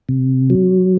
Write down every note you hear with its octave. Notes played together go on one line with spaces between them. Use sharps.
C3
F#3